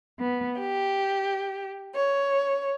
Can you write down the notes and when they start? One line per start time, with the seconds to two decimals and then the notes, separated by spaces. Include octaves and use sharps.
0.20 B3
0.59 G4
1.94 C#5